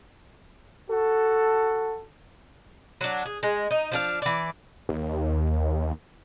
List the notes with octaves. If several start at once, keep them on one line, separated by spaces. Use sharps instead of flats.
F#4 A4
F#3 D4
G#4
G#3
D#4
F3 D4 F5
E3 D5
D#2